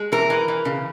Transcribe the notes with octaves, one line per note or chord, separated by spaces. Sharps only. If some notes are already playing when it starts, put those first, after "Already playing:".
Already playing: G#3
E3 A#4
E3
E3
C#3